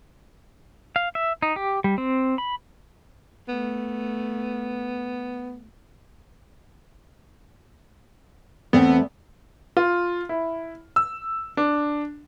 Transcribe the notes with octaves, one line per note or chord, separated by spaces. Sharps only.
F5
E5
D#4
G4
G3
C4
B5
A3 B3
E2 A3 B3 C4
F4
E4
E6
D4